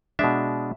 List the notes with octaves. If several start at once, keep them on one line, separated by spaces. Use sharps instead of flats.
B2 G#3 D4 E5